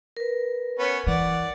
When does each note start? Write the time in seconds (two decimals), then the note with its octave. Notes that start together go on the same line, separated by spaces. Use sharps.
0.17 A#4 B4
0.79 B3 C#4
1.07 E3 D5 F#5